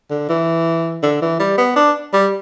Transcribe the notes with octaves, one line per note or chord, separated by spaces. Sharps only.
D3
E3
D3
E3
G3
B3
D4
G3